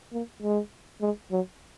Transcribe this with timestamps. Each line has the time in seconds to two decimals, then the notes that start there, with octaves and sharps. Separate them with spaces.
0.13 A#3
0.42 G#3
1.01 G#3
1.31 F#3